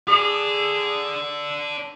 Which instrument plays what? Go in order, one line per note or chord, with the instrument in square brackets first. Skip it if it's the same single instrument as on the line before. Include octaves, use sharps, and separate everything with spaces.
[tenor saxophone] G#4 [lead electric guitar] A4 D5